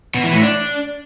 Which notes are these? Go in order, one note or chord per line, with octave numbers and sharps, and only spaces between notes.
B2
E3
A2
D4